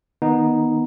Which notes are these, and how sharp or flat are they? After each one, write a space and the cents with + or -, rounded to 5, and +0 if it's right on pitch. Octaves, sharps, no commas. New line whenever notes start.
D#3 +5 B3 -15 D#4 +0